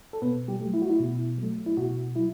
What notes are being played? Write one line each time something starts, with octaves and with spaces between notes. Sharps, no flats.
A4
B2 B3 B4
G3 G4
F#3 A3
E4
F#4
E4
B2
F#3 A3
E4
B2 F#4
F#3 E4